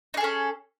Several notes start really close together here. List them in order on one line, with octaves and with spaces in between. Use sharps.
D#4 G#4 A4 C#4